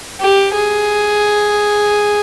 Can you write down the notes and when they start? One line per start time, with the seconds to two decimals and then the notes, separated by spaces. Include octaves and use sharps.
0.21 G4
0.53 G#4